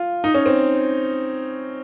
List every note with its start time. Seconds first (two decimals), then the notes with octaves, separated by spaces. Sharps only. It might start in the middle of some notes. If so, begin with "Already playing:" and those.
Already playing: F4
0.24 D#4
0.34 C#4
0.46 C4